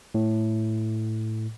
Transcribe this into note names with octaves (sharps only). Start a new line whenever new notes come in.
A2